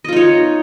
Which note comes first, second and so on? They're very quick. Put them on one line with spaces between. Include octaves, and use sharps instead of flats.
D#5 F4 D#4 C#5